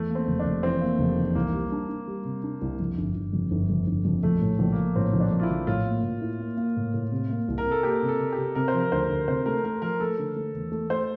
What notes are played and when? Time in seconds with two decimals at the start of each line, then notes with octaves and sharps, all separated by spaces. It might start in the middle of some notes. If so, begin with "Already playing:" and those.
Already playing: E2 A3
0.10 A#3
0.15 C4
0.28 F1
0.39 D4
0.45 F1
0.63 E3 C4
0.81 A#3
0.99 F1
1.17 E2
1.35 C2 A#3
1.54 G3
1.72 D4
1.89 D4
2.07 G3
2.25 C3
2.43 D4
2.62 C2
2.80 F2
2.98 G1
3.15 G1
3.33 F2
3.51 G1
3.70 F2
3.87 G1
4.05 F2
4.23 A#1 A3
4.41 A2
4.59 A#1
4.72 A#3
4.77 A#1
4.96 A2 C4
5.14 A#1
5.20 D4
5.31 A#1
5.39 F4
5.43 E4
5.50 A#1
5.67 A2 F4
5.86 A#3
6.03 A2
6.21 E4
6.40 A#3
6.57 A#3
6.76 A2
6.94 A2
7.11 C3
7.30 A#3
7.48 C2
7.58 A#4
7.66 C3
7.71 A4
7.83 A#3 G4
8.02 C3
8.08 A4
8.20 C3
8.32 G4
8.38 C3
8.55 C3 A#4
8.68 C5
8.74 F3
8.80 A#4
8.92 D2 C5
9.04 A#4
9.09 D2
9.28 C3 C5
9.46 A3 A#4
9.64 A3 A#4
9.82 F3 A#4
10.00 A3 A4
10.18 D3
10.36 A3
10.54 E2
10.72 A3
10.90 A3 C5